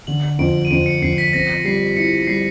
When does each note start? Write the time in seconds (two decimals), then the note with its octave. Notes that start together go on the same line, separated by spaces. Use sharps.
0.07 D3 F#7
0.39 F2 D7
0.65 D#7
0.71 F2 D7
0.86 C#7
1.02 F2 C7
1.13 C7
1.18 B6
1.33 C4 A#6
1.65 G3 C7
1.97 E4 C#7
2.27 G3 C7